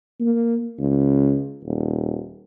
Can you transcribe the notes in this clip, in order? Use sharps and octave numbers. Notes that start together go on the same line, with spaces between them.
A#3
C#2
D#1